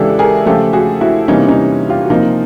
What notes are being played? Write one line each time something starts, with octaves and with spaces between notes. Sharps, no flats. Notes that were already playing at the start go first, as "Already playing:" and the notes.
Already playing: C#3 E3 G#3 D4 E4 G4 A4
G#4 A#4
C#3 F3 A3 G4 A4
F#4 G#4
E4 F#4
C3 E3 G3 A#3 C#4 D#4
C#4 D#4
F4 G4
F#4
C3 F3 A#3 D#4 F4